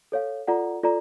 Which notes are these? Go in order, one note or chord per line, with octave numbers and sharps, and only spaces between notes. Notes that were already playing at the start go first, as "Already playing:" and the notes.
A4 C#5 F5
F4 A4 D5 F#5 A#5
F4 A4 D5 A#5